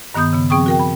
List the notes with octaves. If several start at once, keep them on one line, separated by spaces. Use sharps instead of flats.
G2 D#3 B3 D#6 G6
C#3 B3
F3 C4 G#4 G5 C#6 D#6
F#4 A#4 G5
B5